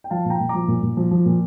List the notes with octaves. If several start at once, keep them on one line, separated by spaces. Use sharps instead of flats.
G5
F3 F5 A5
A#2 G5 A#5
A#2
A#5 D6
F3
A#2
A#2
F3
F3
A#2